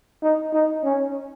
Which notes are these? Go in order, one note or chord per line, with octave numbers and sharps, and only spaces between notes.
D#4
D#4
C#4